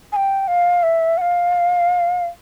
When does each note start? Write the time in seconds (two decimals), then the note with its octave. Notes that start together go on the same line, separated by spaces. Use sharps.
0.12 G#5
0.16 G5
0.48 F5
0.83 E5
1.17 F#5
1.21 F5